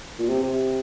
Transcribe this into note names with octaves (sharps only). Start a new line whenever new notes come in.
A#2
C3
C3